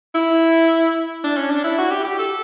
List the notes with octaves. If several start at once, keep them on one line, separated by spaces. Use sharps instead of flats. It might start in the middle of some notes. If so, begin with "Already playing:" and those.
E4
D4
C#4
D4
E4
F#4
G4
G4
A4